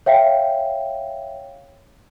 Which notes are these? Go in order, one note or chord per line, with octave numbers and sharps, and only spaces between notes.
C#5 E5 F5 G5